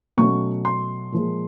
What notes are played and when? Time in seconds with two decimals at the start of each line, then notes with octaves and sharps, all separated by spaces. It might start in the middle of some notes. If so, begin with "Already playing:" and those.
0.17 B2 F#3 A3 C#4 C#6
0.65 C6
1.12 A#2 F3 G#3